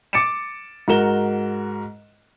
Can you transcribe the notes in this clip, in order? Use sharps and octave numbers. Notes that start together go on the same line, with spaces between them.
D6 A6 C#7 D7 E7
G#2 F#4 A#4 E7 G7